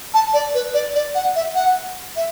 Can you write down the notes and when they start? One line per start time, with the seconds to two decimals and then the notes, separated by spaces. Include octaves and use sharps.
0.14 A5
0.34 D5
0.54 B4
0.74 D5
0.94 D5
1.15 F#5
1.36 E5
1.55 F#5
2.16 E5